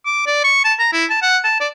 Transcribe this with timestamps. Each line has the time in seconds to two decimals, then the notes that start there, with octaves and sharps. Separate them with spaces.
0.06 D6
0.26 D5
0.44 C#6
0.64 A5
0.79 A#5
0.93 E4
1.10 A5
1.22 F#5
1.44 A5
1.60 D5